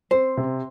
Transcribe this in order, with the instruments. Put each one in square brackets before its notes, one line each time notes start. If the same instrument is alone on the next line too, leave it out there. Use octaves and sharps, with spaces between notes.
[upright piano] C4 [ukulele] C5
[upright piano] C3